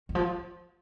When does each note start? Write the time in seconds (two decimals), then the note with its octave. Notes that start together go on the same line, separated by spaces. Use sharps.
0.09 D#3
0.15 F3